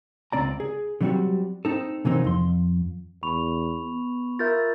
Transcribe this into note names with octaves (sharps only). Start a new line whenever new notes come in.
C#2 C4 D5 A#5
G#4
D3 F#3 G3 A3 C4 F#4
C4 D#4 A4
C3 E3 F#3 A#3 C4 D#4
F2 C6
E2 B5 C#6 F7
B3
F4 A#4 E5 G6 A6